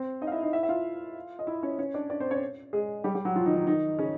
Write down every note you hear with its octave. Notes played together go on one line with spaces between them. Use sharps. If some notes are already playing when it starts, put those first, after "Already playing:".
Already playing: C4 C5
D#4 D#5
F5
E4 E5
D#4 D#5
E4 E5
E5
F4 F5
D#5
E4 E5
C#4 C#5
C#4 C#5
D4 D5
D4 D5
C4 C5
C#4 C#5
G#3 G#4
G3 G4
G3 G4
F#3 F#4
F3 F4
D#3 D#4
D#3 D#4
D#3 D#4
C#3 C#4